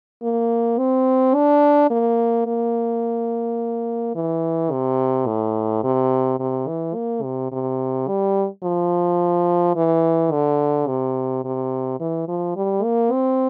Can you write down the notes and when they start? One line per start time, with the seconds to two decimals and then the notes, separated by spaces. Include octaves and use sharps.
0.23 A#3
0.78 C4
1.35 D4
1.91 A#3
2.47 A#3
4.16 E3
4.72 C3
5.27 A2
5.84 C3
6.40 C3
6.68 E3
6.95 A#3
7.23 C3
7.52 C3
8.08 G3
8.63 F3
9.76 E3
10.32 D3
10.88 C3
11.44 C3
12.00 E3
12.28 F3
12.56 G3
12.83 A#3
13.12 C4